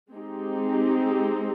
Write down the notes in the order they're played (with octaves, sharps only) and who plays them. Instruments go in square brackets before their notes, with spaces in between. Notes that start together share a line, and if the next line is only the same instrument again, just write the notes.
[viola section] G#3 C4 D#4 G4